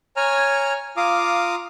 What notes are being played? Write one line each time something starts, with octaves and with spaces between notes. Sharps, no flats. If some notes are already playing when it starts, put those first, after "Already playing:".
C#5 G#5 A#5 F6
F4 F5 A#5 D6 D#6